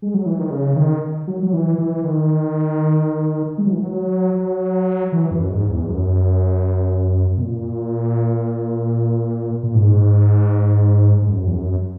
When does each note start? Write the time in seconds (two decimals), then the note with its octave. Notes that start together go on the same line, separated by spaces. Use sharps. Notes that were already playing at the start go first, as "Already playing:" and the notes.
0.02 G#3
0.14 F#3
0.26 E3
0.39 D#3
0.51 C#3
0.76 D#3
1.27 F#3
1.43 F#3
1.53 E3
1.78 E3
2.04 D#3
3.58 G#3
3.66 F#3
3.73 E3
3.81 F#3
4.34 F#3
5.12 E3
5.31 F#2
5.50 G#2
5.69 E2
5.88 F#2
7.38 B2
7.43 A#2
9.63 A#2
9.75 G#2
11.22 G#2
11.28 F#2
11.48 E2
11.53 F#2